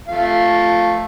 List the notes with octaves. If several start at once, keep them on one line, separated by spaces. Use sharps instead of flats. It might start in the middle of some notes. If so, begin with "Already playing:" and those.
F3 A3 F5